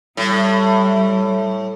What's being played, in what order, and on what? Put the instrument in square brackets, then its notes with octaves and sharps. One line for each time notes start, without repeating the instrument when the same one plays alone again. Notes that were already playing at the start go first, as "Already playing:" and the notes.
[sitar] A2 [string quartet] G3